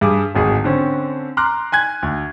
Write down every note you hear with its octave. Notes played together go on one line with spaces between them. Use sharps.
G2 G#4 D6
D1 G#1 G#4
D3 C4 C#4
A#5 C6 D6 F6 F#6
G#5 F#6 G#6
D2